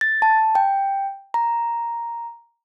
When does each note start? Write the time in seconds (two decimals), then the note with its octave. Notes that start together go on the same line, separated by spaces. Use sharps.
0.01 A6
0.22 A5
0.55 G5
1.34 A#5